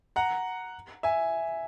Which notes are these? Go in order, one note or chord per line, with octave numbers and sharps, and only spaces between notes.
F#5 A#5
E5 G#5